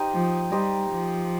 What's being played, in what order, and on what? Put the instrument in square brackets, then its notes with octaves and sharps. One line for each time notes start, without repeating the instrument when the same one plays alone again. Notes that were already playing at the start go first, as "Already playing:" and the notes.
Already playing: [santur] D#4 G4 C5 D#5
[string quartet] F3
[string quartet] G3 [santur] D#4 G4 C5 D#5
[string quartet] F3